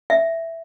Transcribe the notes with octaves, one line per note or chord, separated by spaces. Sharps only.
E5